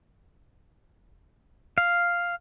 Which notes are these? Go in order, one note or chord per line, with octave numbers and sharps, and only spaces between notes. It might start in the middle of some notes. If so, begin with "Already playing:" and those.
F5